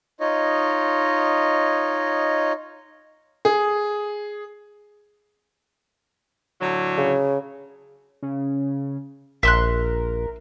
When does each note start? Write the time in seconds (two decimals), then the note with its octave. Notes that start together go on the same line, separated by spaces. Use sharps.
0.20 D#4 F4 C#5 D#5
3.45 G#4
6.61 A2 D3 F#3
6.98 C#3
8.22 C#3
9.43 A#1 A#4 E5 C6 F#6